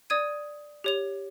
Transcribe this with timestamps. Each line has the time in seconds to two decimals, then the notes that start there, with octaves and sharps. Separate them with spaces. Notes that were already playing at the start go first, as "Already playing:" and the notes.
0.10 D5 D#6 G#6 D#7
0.84 G4 C#5 F7